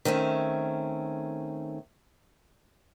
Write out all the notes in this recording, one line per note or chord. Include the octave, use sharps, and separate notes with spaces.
D#3 A3 C4 C#4